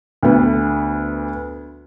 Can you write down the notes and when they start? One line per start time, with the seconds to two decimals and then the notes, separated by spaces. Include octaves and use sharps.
0.23 D2 B3